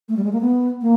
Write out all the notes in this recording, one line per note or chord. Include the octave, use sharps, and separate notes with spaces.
A3
G3
G#3
A#3
B3
A#3